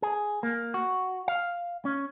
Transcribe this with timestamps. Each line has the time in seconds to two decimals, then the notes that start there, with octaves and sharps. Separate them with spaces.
0.02 G#4
0.43 A#3
0.74 F#4
1.28 F5
1.85 C#4